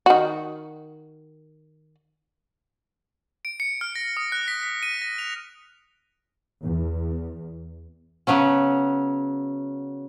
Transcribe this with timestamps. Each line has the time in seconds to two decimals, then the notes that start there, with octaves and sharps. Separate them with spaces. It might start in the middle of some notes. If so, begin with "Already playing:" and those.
0.06 D#3 F#4
3.45 D7
3.60 C#7
3.81 F6
3.95 A#6
4.17 D#6
4.32 F#6
4.48 B6
4.63 B6
4.83 D#7
5.02 A#6
5.18 F7
6.62 E2
8.27 C#3 F#3 B3 C#4